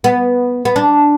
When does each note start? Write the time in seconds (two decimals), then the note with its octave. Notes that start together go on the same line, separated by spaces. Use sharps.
0.04 B3
0.65 B3
0.76 D4